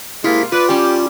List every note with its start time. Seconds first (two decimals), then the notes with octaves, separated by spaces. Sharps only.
0.24 C3 G#3 A#3 E4 F4 B6
0.52 F4 B4 D5
0.69 G3 C#4 G4